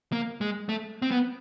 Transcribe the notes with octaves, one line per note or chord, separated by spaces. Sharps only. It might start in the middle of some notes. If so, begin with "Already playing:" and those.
A#3
G#3
A3
C4
B3